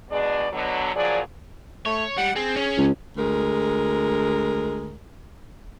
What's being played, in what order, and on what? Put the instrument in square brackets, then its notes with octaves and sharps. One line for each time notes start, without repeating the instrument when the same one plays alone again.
[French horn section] B2 G#3 D4 G#4 D5
B2 D3 F#3
A#2 F3 F#3 G#4 D5
[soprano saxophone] A3 [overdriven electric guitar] C#5
[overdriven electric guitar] G3 [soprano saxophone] F#5
[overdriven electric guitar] C4 [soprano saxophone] G#4
[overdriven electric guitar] C#4
[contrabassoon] C#2
[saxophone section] D2 G#3 A#4